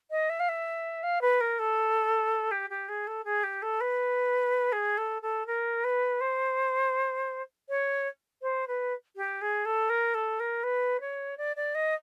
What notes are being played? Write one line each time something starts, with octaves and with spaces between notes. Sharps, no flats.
D#5
E5
F5
E5
F5
B4
A#4
A4
G4
G4
G#4
A4
G#4
G4
A4
B4
G#4
A4
A4
A#4
B4
C5
C#5
C5
B4
G4
G#4
A4
A#4
A4
A#4
B4
C#5
D5
D5
D#5